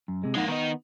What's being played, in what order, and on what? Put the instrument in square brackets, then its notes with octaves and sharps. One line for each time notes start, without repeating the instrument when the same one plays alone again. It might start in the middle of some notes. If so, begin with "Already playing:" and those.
[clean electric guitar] F#2
C3 G#3
[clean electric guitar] F2 D#4 F#5 [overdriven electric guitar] G#3 A#3
[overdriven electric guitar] D#3 D#4 [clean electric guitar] B3